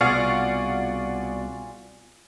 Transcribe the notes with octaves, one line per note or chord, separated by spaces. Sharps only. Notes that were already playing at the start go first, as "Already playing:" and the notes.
C2 B2 F4 G#4 D5 F5 F#5 C#6